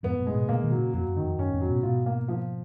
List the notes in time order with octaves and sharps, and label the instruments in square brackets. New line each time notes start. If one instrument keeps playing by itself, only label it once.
[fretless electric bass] F2 G#2 [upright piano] B3
[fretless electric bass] F#2 A#2
[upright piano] G#3
[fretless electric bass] G#2 B2
[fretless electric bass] A#2 C#3 [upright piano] A#3
[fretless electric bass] B2 D#3
[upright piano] F#3
[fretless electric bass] A#2 C#3
[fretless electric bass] F2 [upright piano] F#3
[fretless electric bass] F#2
[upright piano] D#3
[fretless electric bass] F2
[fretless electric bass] F#2 [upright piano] C#4
[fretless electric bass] F2 G#2
[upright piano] F#3
[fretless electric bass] G#2 B2
[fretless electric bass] G#2 B2 [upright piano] F4
[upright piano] A#3
F3